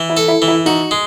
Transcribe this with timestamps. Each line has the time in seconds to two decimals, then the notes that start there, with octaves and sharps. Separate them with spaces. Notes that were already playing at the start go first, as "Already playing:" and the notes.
Already playing: E3
0.09 E4
0.17 A4
0.28 E4
0.42 E3
0.48 E4
0.66 D#4 F#4
0.91 G#3